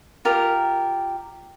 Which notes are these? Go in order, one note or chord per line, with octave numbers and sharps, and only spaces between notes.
F4 G4 A#4